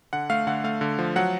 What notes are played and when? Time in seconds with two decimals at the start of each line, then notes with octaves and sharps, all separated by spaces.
0.13 D3 F#5
0.30 A3 F5
0.47 D3 F#5
0.64 A3 F5
0.81 D3
0.99 F3
1.16 F#3 F#5